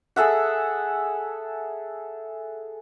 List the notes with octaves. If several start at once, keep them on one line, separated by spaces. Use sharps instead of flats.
G#4 A4 E5 F#5